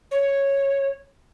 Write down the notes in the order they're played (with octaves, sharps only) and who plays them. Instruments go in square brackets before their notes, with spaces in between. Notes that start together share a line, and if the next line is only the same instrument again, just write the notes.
[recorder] C#5